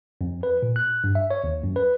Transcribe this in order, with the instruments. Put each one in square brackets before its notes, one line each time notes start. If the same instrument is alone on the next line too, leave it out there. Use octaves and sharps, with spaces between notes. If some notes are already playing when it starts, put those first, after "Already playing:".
[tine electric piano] F2
B4
A#2
F#6
G2
E5
C#5
D#2
F#2
B4